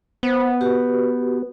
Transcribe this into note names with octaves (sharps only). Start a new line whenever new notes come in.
B3 C5
F#4 G4 B4